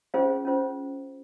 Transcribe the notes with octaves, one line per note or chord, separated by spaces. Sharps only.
C#4 F4 G#4 C5 F5
C#4 F4 C5